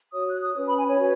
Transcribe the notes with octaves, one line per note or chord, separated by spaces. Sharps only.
F#4 C#5 D#6
F#6
D#6
C#4 B4
B5
G#5
C#5
F#4 B4